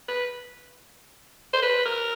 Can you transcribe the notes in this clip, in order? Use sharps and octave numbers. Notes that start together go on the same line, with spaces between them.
B4
C5
B4
A#4